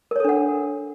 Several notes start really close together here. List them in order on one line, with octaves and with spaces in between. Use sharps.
A#4 C#5 A4 D4 F#5